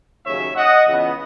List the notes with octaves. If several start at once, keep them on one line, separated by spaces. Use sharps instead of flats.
D#2 C#3 F#3 C#5 E5
D#5 F#5
C#2 C#3 E3 B3